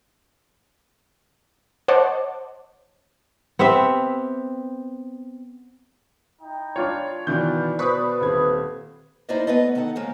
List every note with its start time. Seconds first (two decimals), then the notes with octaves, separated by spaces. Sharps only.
1.88 C5 C#5 D#5 F#5 A5 D6
3.59 B3 C4 G4 E5
6.42 D#4 E4 G5
6.76 D4 F4 C#5
7.27 B2 D#3 E3 F4 B4 D5 G6
7.79 B2 B4 C5 D5 C#6 D#6
8.21 D#1 C4 G#6
9.29 A#3 D#4 E4 C5 D5 D#5
9.47 A3 B3 B4 D5 D#5
9.75 D#3 B3 D#4 A4 F#5
9.95 C#3 F3 G#3 A#3